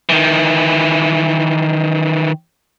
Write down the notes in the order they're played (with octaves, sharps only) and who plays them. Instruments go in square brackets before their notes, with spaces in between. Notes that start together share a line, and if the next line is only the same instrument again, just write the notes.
[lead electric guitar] D#3 E3